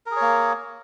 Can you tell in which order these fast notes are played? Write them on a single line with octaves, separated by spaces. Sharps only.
A#4 G#4 C#5 A#3